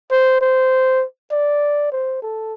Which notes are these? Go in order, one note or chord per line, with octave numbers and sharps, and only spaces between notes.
C5
C5
D5
C5
A4